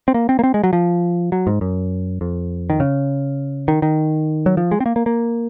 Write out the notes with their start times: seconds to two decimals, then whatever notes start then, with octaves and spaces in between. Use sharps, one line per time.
0.08 C4
0.14 A#3
0.29 C4
0.39 A#3
0.44 C4
0.54 G#3
0.64 F#3
0.73 F3
1.32 F#3
1.47 G#2
1.61 F#2
2.21 F2
2.70 D#3
2.80 C#3
3.68 D#3
3.82 D#3
4.46 F#3
4.57 F3
4.72 G#3
4.80 C4
4.86 A#3
4.96 A#3
5.06 A#3